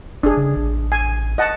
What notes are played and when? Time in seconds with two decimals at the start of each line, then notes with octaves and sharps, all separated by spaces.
0.23 F#1 D4 G#4
0.37 C#3
0.56 A1
0.92 G#5
1.38 D#5 F#5 A5